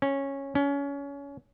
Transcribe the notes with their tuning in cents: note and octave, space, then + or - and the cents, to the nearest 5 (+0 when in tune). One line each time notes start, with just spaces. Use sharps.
C#4 -10
C#4 +25